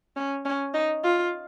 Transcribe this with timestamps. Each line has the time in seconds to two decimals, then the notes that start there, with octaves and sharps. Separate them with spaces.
0.16 C#4
0.45 C#4
0.74 D#4
1.04 F4